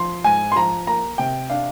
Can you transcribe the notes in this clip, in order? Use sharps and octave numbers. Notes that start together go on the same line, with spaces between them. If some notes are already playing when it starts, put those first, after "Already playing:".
Already playing: F3 C6
G#2 G#5
C6
F3 A#5
A#3 A#5
C3 G5
D4 F5